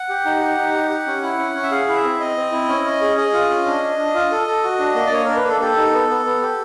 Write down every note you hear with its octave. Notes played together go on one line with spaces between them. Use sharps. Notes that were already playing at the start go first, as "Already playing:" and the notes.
Already playing: F#5
G4
D#4
G4
D#4
G4
G4
C#4
E4
C#4
C#4
E5
G#4 F5
E4
E5
C4
C4 D#5
C4
E4
C#4
C#4
G#4
G#4 D#5
F4
C#4
D4
D4
D4
F4
A4
A4
F#4
D4
A#3
D5
A#3 C#5
D4 A#4
B4
A#3 A4
G4 A4
D#4
B3
B3
B3
G4